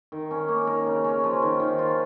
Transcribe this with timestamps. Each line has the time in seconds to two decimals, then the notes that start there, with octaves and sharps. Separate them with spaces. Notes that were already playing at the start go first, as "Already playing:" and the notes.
0.12 D#3
0.31 C#4
0.49 A#3
0.67 A#4
0.87 C#3
1.04 C#4
1.24 F3
1.42 D#3
1.60 D#3
1.79 F4